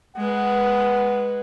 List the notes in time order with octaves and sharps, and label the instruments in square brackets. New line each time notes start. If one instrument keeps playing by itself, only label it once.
[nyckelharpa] G#3 B4 [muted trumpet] F#5